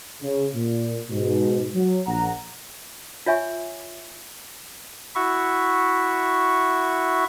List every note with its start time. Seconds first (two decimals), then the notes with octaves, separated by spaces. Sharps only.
0.22 C#3
0.55 A#2
1.09 G#2 B2
1.75 F#3
2.07 A#1 F#5 A#5
3.26 F4 C#5 E5 G#5 C#6
5.15 E4 F#4 E5 C#6